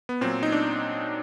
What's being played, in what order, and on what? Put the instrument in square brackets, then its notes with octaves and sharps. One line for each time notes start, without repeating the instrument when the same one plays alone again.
[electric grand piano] B3
A#2 F#3 C4
D#4
D4